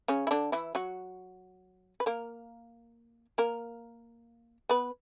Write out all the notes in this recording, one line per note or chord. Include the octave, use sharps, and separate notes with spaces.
C#3 C#4
E4
D3 D4
E3 E4
F#3 F#4
B4
A#3 A#4
A#3 A#4
B3 B4